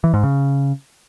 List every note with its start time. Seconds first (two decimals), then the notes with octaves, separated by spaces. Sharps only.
0.04 E3
0.14 G#2
0.23 C#3